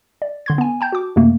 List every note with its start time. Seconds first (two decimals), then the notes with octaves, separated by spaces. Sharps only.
0.22 D5
0.46 D3 C6 G#6
0.58 B3 G#5
0.81 G5 A5 G6
0.92 F#4 D6
1.16 F#2 C3 A3 A#3